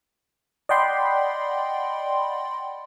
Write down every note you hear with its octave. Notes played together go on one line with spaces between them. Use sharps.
D5 D#5 F#5 G5 B5 C6